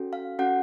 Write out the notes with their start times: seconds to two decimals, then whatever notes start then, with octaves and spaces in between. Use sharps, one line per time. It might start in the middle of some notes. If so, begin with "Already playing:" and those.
Already playing: C#4 F#4 A4
0.13 F5
0.39 C#4 F#4 A4 F#5